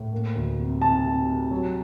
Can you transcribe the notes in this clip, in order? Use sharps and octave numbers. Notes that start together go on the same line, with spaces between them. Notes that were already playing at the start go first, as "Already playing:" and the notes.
Already playing: A2
A#3
D2
C3
C3 A5
C3
C3
F#3